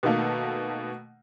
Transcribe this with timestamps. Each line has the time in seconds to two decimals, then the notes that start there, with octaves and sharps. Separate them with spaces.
0.03 B2 D#3 A3 A#3